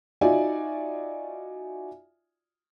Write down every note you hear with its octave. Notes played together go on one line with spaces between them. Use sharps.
D#4 F4 F#4 D5 E5 G#5